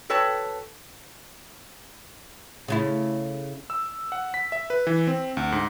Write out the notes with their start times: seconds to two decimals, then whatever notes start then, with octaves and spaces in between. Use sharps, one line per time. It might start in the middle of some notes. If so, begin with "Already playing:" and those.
0.09 F#4 A4 B4 C#5 G5 A5
2.68 C#3 A3 E4
3.70 E6
4.12 F#5
4.34 B6
4.52 E5
4.70 B4
4.87 E3
5.07 C4
5.37 D2
5.52 G#2